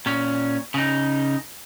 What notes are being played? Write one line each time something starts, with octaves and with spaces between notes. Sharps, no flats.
A#2 C#4
C#3 D#4